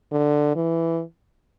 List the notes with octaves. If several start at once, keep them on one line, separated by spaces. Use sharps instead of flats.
D3
E3